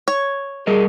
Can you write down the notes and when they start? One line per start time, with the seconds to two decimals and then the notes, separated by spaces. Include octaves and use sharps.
0.08 C#5
0.67 G3 G#4 A#4 D#5